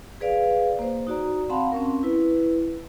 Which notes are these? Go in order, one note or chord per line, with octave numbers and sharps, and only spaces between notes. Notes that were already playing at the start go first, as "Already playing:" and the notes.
G#4 B4 D5 F5
A#3 C5
D#4 F#4 D5 A#5
C4 F5 F#5 A5 B5 C6
C4 C#4 A#4
E4 B4